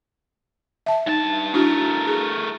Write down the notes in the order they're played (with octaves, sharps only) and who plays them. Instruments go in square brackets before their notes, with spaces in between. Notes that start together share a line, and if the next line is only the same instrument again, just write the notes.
[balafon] E5 A5
[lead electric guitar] G2 A5 [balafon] D#4
[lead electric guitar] A3 A#4 [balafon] D4 E4 F#4
[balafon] G#4